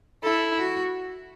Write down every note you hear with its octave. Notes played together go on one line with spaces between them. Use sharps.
E4 A4
F#4